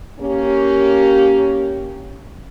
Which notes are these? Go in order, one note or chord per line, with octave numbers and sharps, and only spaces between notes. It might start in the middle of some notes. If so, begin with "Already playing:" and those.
A#3 C#4 G4